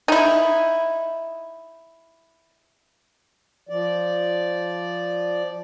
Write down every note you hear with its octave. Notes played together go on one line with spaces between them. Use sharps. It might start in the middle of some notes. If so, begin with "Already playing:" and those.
D#4 E4
F3 D5